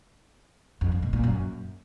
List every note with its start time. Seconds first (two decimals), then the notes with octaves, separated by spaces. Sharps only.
0.81 F2
0.92 G2
1.02 A#2
1.13 A#2
1.24 F#2